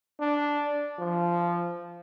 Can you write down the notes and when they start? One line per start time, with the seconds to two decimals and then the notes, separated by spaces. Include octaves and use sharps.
0.20 D4
0.98 F3